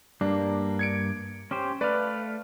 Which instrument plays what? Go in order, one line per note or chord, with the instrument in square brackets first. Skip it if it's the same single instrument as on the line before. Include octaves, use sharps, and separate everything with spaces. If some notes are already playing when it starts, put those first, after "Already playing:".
[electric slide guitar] G2 G3 A#3 [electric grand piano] D4
[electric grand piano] G#6 C#7 D7
[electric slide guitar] C#4 G4 C5
[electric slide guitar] A3 F5 [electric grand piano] B4 D5